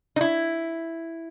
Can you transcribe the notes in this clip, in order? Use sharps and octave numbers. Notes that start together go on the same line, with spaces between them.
D#4
E4